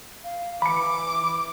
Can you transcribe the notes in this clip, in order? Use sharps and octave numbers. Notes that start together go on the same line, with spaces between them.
F5
E3 B5 D6 C#7